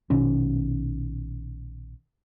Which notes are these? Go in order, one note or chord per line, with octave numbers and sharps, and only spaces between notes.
A#1 B2 D#3 C#4